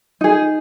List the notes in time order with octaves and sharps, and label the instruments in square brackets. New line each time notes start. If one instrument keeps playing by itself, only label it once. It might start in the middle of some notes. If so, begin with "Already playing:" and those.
[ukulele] D#4 G#4